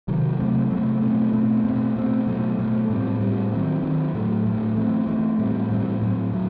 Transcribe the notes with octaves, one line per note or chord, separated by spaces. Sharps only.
C3 D#3 F#3
C3 F#3 A3 C4
C3 F#3 A3 C4
B2 A3 C4
B2 A3 C4
B2 A3 C4
B2 A3 C4
B2 F#3 A3
B2 F#3 A3
A2 G3 C4
A2 G3 C4
D#3 F#3 C4
D#3 F#3 C4
A2 F#3 A3
A2 F#3 A3
E3 A3 C4
E3 A3 C4
A2 E3 G3 C4
A2 E3 G3 C4
A2 F#3 C4
A2 F#3